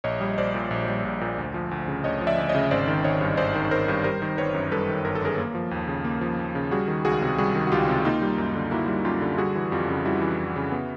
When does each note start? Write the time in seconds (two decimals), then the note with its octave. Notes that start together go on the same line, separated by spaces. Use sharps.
0.04 A#1 C#5 D#5
0.21 G3
0.38 A#1 C5 D5
0.54 A#2
0.71 A#1
0.88 G3
1.05 A#1
1.21 A#2
1.38 D2
1.54 F3
1.71 D2
1.88 C#3
2.04 D2 C#5 D#5
2.21 F3
2.27 D5 E5
2.38 D2
2.49 C#5 D#5
2.55 C#3
2.71 G#1 C5 D5
2.88 D#3
3.04 G#1 C#5 D#5
3.21 G2
3.37 G#1 C5 D5
3.55 D#3
3.71 G#1 A#4 C5
3.88 G2
4.04 G3 A#4 C5
4.22 D#3
4.37 G1 B4 C#5
4.54 F#2
4.71 G3 A4 B4
4.89 D#3
5.04 G1 A#4
5.15 A4
5.22 F#2 G#4 A#4
5.38 A#3
5.55 F3
5.71 D#2
5.88 C#3
6.05 A#3
6.21 F3
6.39 D#2
6.55 C#3
6.71 G3 F#4 G#4
6.88 D#3
7.05 C#2 F#4 G#4
7.22 C3
7.38 G3 F#4 G#4
7.55 D#3
7.67 F#4
7.72 C#2 F4 G4
7.88 C3
8.05 A#3 D#4 F4
8.22 G3
8.38 F#2
8.55 D3
8.71 A#3 E4 F#4
8.88 G3
9.05 F#2 F4 G4
9.21 D3
9.38 G3 F#4 G#4
9.55 E3
9.72 F2 F4 G4
9.88 C#3
10.05 G3 E4 F#4
10.22 E3
10.39 F2
10.56 C#3
10.71 B3